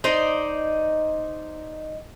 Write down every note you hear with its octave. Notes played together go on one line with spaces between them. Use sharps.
D#4 C5 D5